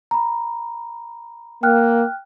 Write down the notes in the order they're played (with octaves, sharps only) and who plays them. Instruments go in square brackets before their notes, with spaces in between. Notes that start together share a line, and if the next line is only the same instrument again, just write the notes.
[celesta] A#5 B5
[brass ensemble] A#3 [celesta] G5 F6 F#6